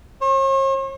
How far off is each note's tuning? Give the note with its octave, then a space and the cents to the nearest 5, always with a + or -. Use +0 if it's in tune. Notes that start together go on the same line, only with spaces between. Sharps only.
C#5 -45